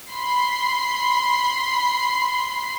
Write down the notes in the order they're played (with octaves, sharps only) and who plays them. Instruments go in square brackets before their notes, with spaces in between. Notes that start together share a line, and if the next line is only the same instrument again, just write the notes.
[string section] B5 C6 C7